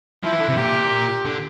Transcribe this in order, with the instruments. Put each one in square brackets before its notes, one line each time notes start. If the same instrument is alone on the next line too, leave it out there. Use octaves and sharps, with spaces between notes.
[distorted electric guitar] F3 [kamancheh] E4
[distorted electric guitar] E3
D3
C3
[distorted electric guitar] A#2 [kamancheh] G4
[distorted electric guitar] D3